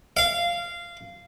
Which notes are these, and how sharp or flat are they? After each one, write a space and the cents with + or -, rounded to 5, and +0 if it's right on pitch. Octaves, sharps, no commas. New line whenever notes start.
F5 -15